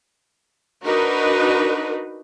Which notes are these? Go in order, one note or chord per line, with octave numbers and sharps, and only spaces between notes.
D4 D#4 F#4 A#4 B4